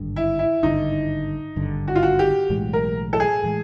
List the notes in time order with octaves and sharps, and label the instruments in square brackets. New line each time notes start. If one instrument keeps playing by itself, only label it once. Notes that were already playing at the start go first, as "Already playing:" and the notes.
Already playing: [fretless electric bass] G#1 G2 D3
[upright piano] E4
E4
[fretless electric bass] G#1 G2 D3 [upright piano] D#4
[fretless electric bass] G#1 G2 D3
[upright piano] F#4
F4
F#4
G4
[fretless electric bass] B1 A2 E3 G#3
[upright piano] A#4
A4
G#4
[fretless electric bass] A2 E3 G#3